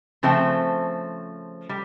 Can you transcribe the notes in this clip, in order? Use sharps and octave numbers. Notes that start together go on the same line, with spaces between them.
C#3 F3 A3 C4
G3